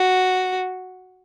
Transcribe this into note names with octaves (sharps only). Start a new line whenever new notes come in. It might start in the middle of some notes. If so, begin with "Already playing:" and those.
Already playing: F#4